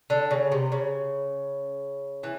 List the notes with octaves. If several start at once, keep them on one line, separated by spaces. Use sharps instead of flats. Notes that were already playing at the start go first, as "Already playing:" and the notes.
D3
C#3
C3
C#3
E3